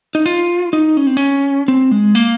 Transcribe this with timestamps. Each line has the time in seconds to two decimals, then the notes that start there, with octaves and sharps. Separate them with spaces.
0.15 D#4
0.26 F4
0.73 D#4
0.97 C#4
1.07 C4
1.17 C#4
1.68 C4
1.91 G#3
2.15 A#3